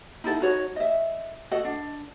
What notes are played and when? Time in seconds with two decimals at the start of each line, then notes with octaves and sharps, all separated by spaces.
0.24 D#4 E4 A4 F#5
0.41 D#4 F#4 C#5
0.76 D#5 E5
1.51 F#4 A4 D#5 F#5
1.64 D4